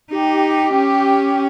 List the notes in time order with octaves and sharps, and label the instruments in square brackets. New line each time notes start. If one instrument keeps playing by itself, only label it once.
[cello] D#4 [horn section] G4
[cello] C#4